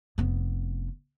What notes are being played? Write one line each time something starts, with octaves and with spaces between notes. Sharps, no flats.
F1 B3